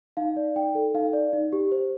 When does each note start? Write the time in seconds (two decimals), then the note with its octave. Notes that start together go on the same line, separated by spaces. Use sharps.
0.17 D#4 F5
0.37 D5
0.56 D#4 G5
0.75 A4
0.95 D#4 F5
1.13 D5
1.33 D#4
1.53 G4
1.72 C5